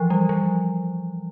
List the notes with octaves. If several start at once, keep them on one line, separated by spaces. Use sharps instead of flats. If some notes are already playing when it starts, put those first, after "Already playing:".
Already playing: E3 F3
G3
F3